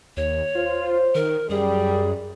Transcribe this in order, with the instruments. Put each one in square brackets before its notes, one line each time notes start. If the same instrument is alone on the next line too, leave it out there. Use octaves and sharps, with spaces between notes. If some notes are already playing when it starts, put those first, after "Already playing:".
[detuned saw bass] D#2 [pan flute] C#5
[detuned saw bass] F4 [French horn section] C5
[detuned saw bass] D#3 [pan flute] A#4
[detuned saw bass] F#2 [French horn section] G3 [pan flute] G#4